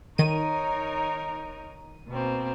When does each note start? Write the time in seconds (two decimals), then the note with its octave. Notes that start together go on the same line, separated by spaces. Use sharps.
0.18 D#3 D#4 A#4 C#5 D#7
2.10 B2 A#3 C4